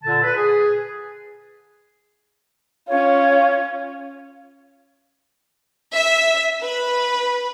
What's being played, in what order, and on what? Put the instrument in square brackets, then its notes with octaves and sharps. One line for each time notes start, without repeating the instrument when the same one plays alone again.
[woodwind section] A#2 D3 A5
B4
G#4
[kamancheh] C#4 F4 [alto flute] C#5
[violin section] E5
B4